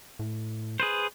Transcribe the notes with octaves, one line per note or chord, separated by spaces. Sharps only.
A2
G#4 B4 C5